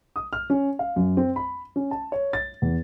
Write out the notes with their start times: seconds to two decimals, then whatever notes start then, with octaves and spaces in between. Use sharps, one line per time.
0.16 D#6
0.33 F6
0.50 C#4
0.79 F5
0.96 F#2
1.17 C4
1.36 B5
1.76 C#4
1.91 A5
2.12 C#5
2.33 A6
2.62 E2